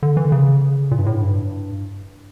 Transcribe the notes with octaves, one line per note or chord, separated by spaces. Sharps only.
D3
E3
D3
C#3
A#2
G2
A2
G2